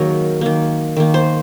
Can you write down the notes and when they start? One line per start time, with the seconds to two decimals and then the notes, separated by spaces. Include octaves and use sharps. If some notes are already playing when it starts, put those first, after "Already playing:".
Already playing: D#3 F#3 A#3 G#4 A#4
0.41 D#3 A#3
0.97 D#3 A#3
1.14 C5